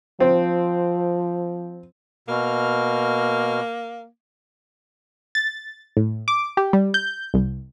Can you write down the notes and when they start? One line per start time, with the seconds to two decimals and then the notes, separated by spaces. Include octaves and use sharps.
0.20 F3 C4
2.28 B2 A#3 F6
5.35 A6
5.97 A2
6.28 D6
6.57 G4
6.73 G3
6.94 G6
7.34 C2